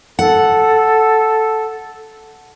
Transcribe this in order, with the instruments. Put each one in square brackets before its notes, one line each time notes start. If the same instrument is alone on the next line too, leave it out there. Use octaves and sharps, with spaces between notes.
[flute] A4 [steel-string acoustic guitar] F#5